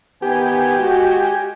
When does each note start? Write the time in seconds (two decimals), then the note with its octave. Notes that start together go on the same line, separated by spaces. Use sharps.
0.22 D#3 B3 G4 G#5
0.78 G#3 F#4